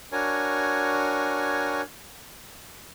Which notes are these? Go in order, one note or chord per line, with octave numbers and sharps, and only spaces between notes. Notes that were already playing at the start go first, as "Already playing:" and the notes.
D4 F#4 A#4 C#5 G#5